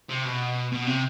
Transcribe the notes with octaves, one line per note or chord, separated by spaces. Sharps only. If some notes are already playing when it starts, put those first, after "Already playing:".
C3
B2
B2
C3